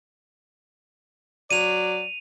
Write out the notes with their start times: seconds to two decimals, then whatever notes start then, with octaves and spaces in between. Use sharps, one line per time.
1.51 F#3 D5 D#7 F7